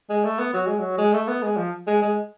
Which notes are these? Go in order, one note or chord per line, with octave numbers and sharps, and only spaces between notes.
G#3
A3
B3
F#3
G#3
F#3
G#3
A3
B3
G#3
F3
G#3
G#3